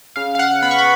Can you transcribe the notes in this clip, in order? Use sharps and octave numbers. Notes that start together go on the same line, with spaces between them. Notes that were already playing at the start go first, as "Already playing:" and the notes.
C#3 F5
F5
F#5
B3 B5
C#6
B5